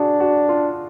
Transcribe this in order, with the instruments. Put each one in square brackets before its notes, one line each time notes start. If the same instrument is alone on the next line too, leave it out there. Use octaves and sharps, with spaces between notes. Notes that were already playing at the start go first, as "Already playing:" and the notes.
Already playing: [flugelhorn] D4 [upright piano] F#4 G#4
[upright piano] F#4
F4